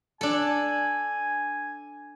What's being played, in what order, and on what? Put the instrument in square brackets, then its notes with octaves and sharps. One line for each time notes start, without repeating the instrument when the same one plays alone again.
[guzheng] D4 A4 [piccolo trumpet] G#5